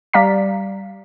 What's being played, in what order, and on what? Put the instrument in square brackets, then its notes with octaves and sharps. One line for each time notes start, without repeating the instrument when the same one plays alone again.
[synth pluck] G3 D5 F5 A#5 B6